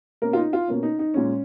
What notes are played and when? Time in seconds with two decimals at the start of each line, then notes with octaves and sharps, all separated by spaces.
0.22 B2 A#3 C#4 A#4
0.33 F4
0.37 D#4
0.53 F4
0.68 B2 A#3 C#4
0.83 D#4
0.99 D#4
1.14 A#2 G#3 C#4